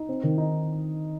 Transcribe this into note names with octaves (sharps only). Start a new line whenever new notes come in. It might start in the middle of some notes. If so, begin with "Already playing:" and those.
Already playing: D#4
C4
D#3
D#4